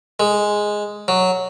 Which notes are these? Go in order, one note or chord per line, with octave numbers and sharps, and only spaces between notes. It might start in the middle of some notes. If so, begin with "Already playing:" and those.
G#3
F#3